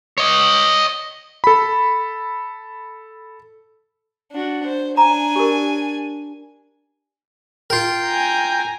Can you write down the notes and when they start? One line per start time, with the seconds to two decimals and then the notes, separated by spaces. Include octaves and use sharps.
0.18 C#5 D#5
1.44 A4 B5
4.32 D4 F#4
4.66 C5
4.97 D4 G#5 A#5
5.36 G4 A#4
7.70 F4 A#4 G5
8.06 G#5 A#5